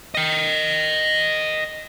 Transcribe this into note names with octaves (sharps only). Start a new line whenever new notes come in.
D#5 G5